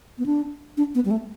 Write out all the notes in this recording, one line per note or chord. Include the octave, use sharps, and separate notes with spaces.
B3
D4
D4
B3
G3
A3